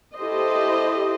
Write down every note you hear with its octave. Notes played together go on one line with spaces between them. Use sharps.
E4 G4 A4 C5 D#5